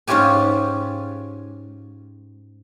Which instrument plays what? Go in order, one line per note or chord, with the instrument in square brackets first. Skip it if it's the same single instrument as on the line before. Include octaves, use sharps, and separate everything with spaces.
[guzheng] G#2 C#4 F4 G4 G#5